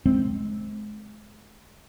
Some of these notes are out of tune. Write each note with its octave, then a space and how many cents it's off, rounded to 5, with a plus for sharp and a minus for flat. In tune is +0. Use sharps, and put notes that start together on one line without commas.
G#3 +30 C4 +5